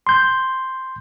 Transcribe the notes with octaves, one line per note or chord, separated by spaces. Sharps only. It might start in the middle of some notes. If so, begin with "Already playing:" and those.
C6 G6